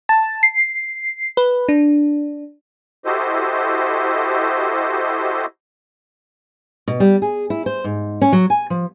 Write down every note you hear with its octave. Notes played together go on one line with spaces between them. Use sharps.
A5
C7
B4
D4
E4 F#4 G4 A4 C5 D#5
B2
G3
G#4
E4
C5
G#2
C#4
F#3
G#5
F3